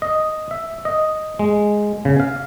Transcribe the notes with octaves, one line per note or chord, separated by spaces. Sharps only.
D#5
E5
D#5
G#3
C#3
F5